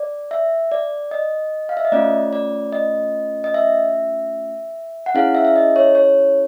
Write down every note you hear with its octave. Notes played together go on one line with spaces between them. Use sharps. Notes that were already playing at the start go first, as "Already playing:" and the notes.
Already playing: D5
E5
D5
D#5
F5
E5
D#5
A3 C#4 F4 D5
D5
D#5
D#5
E5
F#5
C#4 E4 G#4 F5
E5
E5
D#5
C#5
C#5